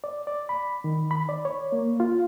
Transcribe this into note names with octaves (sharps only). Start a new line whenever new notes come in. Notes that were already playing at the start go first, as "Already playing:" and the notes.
D5
D5
B5
D#3
B5
D5
C#5
A#3
F4